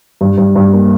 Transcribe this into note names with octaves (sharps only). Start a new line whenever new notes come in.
G2
G2
G2
A#3